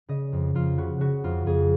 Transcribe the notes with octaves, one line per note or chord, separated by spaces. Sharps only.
C#3 D#5
F2
F2 F4
C#3 F#4
C#3 F#4
F2 F4
F2 G#4